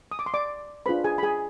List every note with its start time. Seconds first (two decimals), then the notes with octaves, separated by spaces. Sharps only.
0.11 D#6
0.19 D6
0.26 C6
0.34 D5 D6
0.86 D4 F4 G#4 B4 C5 B5
1.04 G#4 G#5
1.18 B5
1.23 G#4 G#5